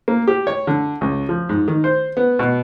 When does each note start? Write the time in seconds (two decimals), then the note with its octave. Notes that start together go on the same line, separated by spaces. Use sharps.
0.08 A#3
0.27 G4
0.47 C#5
0.67 D3
1.01 C#2
1.29 F3
1.49 G#2
1.68 D#3
1.84 C5
2.17 B3
2.39 B2